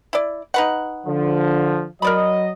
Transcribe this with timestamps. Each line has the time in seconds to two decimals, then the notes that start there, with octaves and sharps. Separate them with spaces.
0.13 E4 D5
0.54 D#4 B4 F#5
1.07 D3 F3
2.02 F#3 A#4 D5 D#5 B5